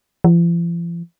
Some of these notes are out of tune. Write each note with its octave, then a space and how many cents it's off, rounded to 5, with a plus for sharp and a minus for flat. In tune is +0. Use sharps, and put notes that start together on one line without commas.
F3 -45